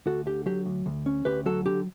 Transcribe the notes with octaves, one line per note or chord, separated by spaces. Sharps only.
D2 F#4 A4
D3 G4
F#3 G4
D2
D2
C#4
D2 G4 B4
F#3 F#4 A4
D3 G4